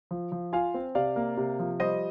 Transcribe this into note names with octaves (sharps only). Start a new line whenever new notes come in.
F3
F3
F4 F5 G#5
C4
C3 D5 F5
A#3
C3
F3
G3 C5 D#5